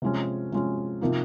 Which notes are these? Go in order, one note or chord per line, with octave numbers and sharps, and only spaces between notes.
C3 F3 G#3 C#4
C3 F3 G#3 C#4
C3 F3 A#3 D#4